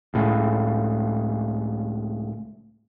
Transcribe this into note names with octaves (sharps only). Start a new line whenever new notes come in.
C#2 A2 C#3